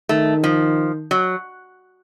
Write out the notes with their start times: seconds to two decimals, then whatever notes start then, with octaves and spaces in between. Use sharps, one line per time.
0.09 D#3 A3
0.44 F3
1.11 F#3